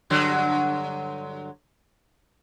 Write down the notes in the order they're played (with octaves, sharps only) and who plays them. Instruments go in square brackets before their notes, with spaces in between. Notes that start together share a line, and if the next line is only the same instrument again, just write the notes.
[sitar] G2 D3 F#3